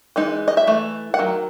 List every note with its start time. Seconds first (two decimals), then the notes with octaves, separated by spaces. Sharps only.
0.16 E3 G#3 D#4
0.48 D#5
0.57 E5
0.67 E3 A3
1.14 F#5
1.19 D#3 F#3